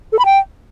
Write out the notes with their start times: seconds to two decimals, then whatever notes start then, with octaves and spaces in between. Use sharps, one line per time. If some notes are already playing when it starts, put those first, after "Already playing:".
0.13 A4
0.19 B5
0.25 G5